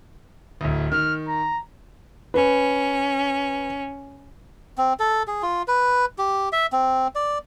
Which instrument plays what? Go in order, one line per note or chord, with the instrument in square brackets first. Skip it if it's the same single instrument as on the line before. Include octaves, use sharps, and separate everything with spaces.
[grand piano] D1 D2
[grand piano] D#3 [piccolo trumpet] F6
[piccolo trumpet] A#5
[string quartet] C#4 [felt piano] B4
[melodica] C4
A4
G#4
F4
B4
G4
E5
C4
D5